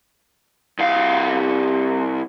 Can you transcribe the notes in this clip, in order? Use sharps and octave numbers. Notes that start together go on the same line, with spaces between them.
C2 F5